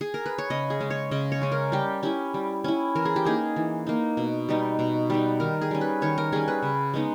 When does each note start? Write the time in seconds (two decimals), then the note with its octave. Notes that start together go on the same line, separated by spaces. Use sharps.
0.01 G#4
0.14 A#4
0.26 B4
0.38 C#5
0.50 C#3 D#5
0.70 G#4
0.80 G#3 C#4
0.90 C#5
1.11 C#3 D#5
1.32 C#5
1.42 G#3 C#4
1.52 A#4
1.72 G3 G4
2.03 C#4 E4 G4
2.34 G3
2.64 C#4 E4
2.95 E3 A#4
3.05 G#4
3.16 G4
3.25 A#3 D#4 G#4
3.56 E3
3.87 A#3 D#4
4.17 B2
4.49 G3 B3 D#4
4.79 B2
5.10 G3 B3 D#4
5.40 D#3 A#4
5.61 G#4
5.71 G3 C#4
5.81 B4
6.02 D#3 C#5
6.18 A#4
6.32 G3 C#4 G#4
6.48 B4
6.63 C#3
6.94 G#3 B3 D#4